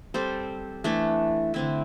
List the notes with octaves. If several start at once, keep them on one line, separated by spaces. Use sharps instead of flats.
G3 C4 A4 C5
E3 A3 D4 A4
D3 C4 E4